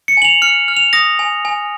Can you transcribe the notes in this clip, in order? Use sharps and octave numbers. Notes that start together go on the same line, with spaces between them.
C#7
G#5 F#7
F7
F6 C#7
F6
F7
D#6 A#6
G#5
G#5